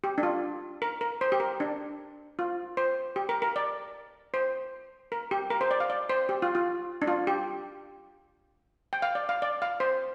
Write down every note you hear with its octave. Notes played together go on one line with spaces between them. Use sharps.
G4
D4
F4
A#4
A#4
C5
G4
A#4
D4
F4
C5
G4
A#4
A#4
D5
C5
A#4
G4
A#4
C5
D5
F5
D5
C5
G4
F4
F4
D4
F4
G4
G5
F5
D5
F5
D5
F5
C5